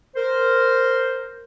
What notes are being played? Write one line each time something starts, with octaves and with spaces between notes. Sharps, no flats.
A#4 C5